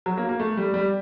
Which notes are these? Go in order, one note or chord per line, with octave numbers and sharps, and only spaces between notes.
F#3
A#3
A#3
A3
G3
G3